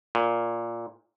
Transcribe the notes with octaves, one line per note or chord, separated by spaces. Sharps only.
A#2